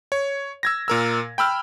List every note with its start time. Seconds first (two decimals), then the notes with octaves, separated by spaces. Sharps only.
0.12 C#5
0.63 E6 G#6 A#6
0.88 A#2 A#4 E6
1.38 G5 B5 E6 F6